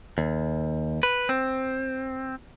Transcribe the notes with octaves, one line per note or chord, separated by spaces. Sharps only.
D#2
B4
C4